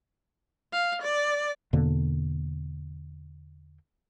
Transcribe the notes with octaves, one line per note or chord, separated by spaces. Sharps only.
F5
D5
E2 B2 D3 A#3